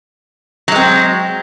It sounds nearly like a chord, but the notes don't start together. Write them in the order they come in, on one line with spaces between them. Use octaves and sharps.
F#3 G#3 C4